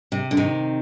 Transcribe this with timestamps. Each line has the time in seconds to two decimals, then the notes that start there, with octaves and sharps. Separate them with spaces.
0.12 C3
0.31 D3
0.37 C3 D#3